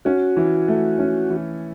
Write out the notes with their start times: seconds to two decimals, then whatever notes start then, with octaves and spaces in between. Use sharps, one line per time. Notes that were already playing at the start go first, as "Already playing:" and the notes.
0.05 C#4 F#4
0.37 E3
0.68 A3
0.99 C#4
1.30 E3